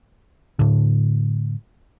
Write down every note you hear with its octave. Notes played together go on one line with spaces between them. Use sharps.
A2 D3